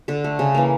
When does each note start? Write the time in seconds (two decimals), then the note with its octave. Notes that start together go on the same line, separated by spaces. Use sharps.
0.08 D3 A4
0.24 A3
0.39 C#3
0.55 E3 A#3